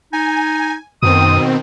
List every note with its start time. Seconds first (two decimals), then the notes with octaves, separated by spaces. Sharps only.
0.13 D#4 G#5
1.03 F#2 B2 D#3 C4 D#6